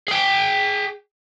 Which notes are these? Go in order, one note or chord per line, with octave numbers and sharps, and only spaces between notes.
G#4 G5